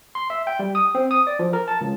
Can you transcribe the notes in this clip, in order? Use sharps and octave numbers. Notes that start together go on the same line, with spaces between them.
C6
E5
G5
G3
D#6
C4
D#6
D5
F3
A#4
A5
C#2